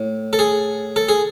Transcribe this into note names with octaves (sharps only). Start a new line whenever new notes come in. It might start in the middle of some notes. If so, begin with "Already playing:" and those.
Already playing: A2
A4
G#4
A4
G#4